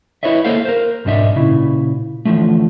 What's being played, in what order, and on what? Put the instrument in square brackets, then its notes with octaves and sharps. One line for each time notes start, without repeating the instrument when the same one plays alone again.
[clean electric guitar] E4 B4 C#5 D#5 E5
A#3 G#4 A4 C5 F5
A#4 C5
B1 G#2 D4 D#5 E5
A#2 C#3 E4
D3 E3 F3 A3